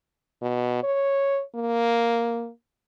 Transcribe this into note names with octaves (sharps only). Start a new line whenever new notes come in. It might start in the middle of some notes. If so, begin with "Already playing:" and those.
B2
C#5
A#3